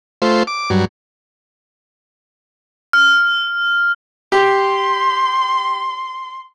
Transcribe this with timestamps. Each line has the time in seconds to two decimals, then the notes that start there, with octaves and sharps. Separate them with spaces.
0.22 A3 F4 C5
0.47 D6
0.70 G2 F#3
2.93 F6
4.32 G4 C6